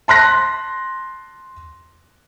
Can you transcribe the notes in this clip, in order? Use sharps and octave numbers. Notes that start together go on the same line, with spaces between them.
A5 C6 F#6 A#6